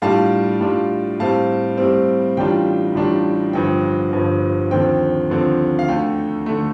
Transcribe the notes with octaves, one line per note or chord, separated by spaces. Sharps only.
A2 G3 D4 F4 F5 A5
A2 G3 D4 F4
A2 G3 C4 F5 A5
A2 G3 C4
A1 A2 G3 D4 F4 G5
A1 A2 G3 D4 F4
G1 G2 F3 G5
G1 G2 F3
D#2 D3 F3 C4 G5
D#2 D3 F3 C4
F5
D2 D3 A3 G5
D3 A3